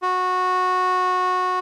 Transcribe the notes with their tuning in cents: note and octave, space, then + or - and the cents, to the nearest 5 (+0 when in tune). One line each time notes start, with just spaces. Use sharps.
F#4 -15